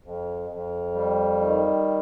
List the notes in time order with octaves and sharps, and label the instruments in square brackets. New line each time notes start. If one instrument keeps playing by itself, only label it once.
[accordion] F2
F2
G3
D#3